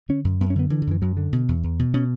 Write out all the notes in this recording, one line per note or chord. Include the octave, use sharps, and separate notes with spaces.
D3 C#4
F#2
F#2 B3
C#4
D3 B3
D3 E3
D3
F#2 E3
F#2 F#3
D3
B2
E2
E2
B2
B2 C#4